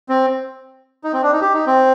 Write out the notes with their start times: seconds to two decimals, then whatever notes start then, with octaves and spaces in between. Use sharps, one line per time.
0.09 C4
1.04 D#4
1.13 C4
1.23 D4
1.32 D#4
1.41 G4
1.54 D#4
1.67 C4